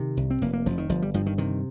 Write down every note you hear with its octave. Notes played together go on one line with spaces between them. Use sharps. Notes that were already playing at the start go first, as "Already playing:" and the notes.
Already playing: C3 D#3
C2
C4
F1 A#3
A#3
F1 F3
D#3
G1 F3
G3
G2 F3
D#3
C3 D#3